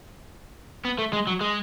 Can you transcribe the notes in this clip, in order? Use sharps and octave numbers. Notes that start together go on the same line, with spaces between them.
B3
A3
G#3
F#3
G#3